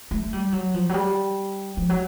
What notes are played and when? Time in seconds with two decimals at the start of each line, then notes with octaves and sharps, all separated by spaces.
0.11 A3
0.33 G3
0.52 F#3
0.74 F3
0.89 F#3
0.94 G3
1.77 F3
1.90 F#3